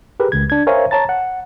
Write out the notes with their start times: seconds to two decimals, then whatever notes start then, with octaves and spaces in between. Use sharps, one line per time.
0.20 G4 G#4 A#4 B4
0.32 C#2 C#3 G#6
0.50 D4 G#6
0.67 A#4 C5 C#5 E5 F5 G#5
0.91 C#5 A5 A#5 A6
1.09 F#5